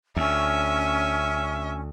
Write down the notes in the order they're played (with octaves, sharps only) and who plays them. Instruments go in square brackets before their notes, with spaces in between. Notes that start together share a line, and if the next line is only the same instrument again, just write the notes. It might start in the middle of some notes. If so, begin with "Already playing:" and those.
[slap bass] D2 [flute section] C#4 [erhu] E5